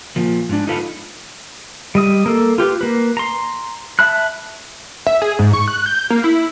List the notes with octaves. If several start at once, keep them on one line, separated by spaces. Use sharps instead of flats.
A#2 F3
G#2 D4
D#4 F4 A4 B4 F5
G3 D#5 D#6
A#3 A4
F4 G4 B4
A#3 B4
A#5 C6
E5 A5 B5 F#6
E5
G#4
G#2
C#6
F#6
G6
A#3
E4